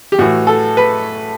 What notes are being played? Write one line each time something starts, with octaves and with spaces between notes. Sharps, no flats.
G4
A2 E3 F#4
A4
B4